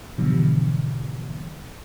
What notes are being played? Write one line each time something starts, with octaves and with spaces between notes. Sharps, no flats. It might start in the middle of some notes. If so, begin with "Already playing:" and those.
G#2 B2 D3 E3 F3 G3